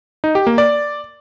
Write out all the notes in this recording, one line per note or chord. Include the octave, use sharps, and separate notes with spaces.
D#4
G4
A#3
D5